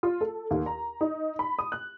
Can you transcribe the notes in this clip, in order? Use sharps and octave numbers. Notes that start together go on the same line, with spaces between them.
F4
A4
D#2
A#5
D#4
B5
D#6
F#6